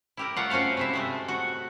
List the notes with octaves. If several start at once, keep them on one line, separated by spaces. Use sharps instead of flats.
E4 G4 A#4
A3 F4 C#5 F5 F#5
C4 C#4 F#4 C5 F5
C3 E4 E5
C3 G#3 A3
F#4